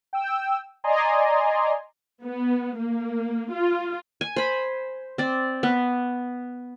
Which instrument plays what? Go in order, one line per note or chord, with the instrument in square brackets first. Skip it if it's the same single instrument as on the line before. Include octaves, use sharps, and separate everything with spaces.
[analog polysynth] G5 E6
D5 D#5 G#5 A#5 C6
[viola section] B3
A#3
F4
[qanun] G#5
C5 B5
C4 D5
B3